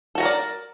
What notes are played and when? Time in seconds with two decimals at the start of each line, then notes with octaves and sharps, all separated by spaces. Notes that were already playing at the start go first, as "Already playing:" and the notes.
0.15 A4
0.18 F#4
0.20 A#5
0.23 A#4
0.25 D5